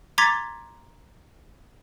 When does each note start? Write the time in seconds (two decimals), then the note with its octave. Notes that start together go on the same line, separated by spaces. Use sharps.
0.18 A#5 C6 D6 G#6 A6 B6